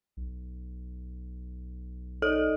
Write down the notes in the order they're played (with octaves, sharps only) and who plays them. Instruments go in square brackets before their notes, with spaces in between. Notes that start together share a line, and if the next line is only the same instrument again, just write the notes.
[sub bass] B1
[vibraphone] D#4 D5 D#5 [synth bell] A4